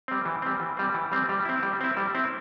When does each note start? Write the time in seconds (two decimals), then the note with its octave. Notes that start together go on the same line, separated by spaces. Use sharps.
0.08 G3 C4
0.25 E3
0.42 G3 C4
0.60 E3
0.77 G3 C4
0.94 E3
1.12 G3 C4
1.29 G3
1.45 C4 E4
1.63 G3
1.81 C4 E4
1.97 G3
2.15 C4 E4